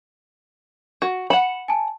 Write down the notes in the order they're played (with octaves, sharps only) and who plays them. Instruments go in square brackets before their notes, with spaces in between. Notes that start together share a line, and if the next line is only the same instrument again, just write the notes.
[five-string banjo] F#4
[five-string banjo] F#5 B5 [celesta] C#7 E7 F#7
[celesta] G#5 A5